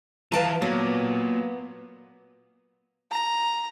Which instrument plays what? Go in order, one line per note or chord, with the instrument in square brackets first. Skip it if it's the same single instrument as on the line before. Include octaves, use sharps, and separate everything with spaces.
[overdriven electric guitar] E3 F3 [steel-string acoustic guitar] B4 A5 A#5 [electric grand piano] F5 D7 D#7
[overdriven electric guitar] A#2 [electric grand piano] F#3 [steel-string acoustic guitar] B3
[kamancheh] A#5